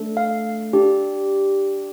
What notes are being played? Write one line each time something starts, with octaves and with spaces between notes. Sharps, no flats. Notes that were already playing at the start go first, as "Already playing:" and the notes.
Already playing: A3 D4 A4
F5
D4 G4